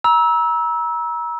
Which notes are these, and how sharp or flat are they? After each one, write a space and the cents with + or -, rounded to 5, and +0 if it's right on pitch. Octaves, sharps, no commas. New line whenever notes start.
A#5 +35 E6 -15